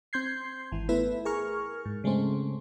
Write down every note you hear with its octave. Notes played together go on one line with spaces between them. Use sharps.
C4 C6 G6 G#6 C7
G#1 E3
A3 B3 E4 B4 E5
G#4 A#4 C#6 F6
G#2
C#3 G#3 A3 C4 C#4